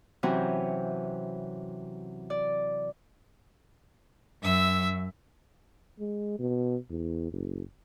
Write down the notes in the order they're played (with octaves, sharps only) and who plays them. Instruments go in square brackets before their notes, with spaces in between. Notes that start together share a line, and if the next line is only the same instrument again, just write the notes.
[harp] C3 E3 F#3 C4 C#4
D5
[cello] F#2 [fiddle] E5 E6
[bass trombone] G#3
B2
E2
F#1